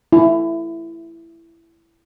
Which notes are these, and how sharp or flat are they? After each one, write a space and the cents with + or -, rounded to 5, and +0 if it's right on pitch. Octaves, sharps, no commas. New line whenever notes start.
E4 +10